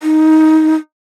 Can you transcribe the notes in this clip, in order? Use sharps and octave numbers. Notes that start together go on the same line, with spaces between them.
D#4